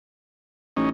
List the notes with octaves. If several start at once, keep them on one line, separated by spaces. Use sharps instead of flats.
A1 C#4 D#4